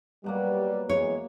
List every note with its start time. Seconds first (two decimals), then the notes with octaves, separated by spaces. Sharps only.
0.24 B2 F#3 G3 A#3
0.90 E2 E3 G#3 C#5